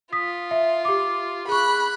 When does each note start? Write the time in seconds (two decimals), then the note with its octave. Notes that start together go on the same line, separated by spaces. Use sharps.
0.13 F4 D#6 B6
0.51 E5
0.85 G4 D6
1.48 G#4 B5 C#6 F#6